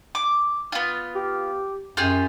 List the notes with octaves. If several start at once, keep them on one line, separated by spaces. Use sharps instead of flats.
D6
B3 F4
G4
F#2 F4 G4 G#4